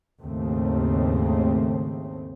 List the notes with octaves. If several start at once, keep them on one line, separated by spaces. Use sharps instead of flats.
D#2 G#2 C#3 A3 C4